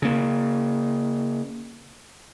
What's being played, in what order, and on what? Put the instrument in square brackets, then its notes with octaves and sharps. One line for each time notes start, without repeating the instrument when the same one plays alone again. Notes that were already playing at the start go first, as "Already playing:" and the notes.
[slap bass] C#3 A#3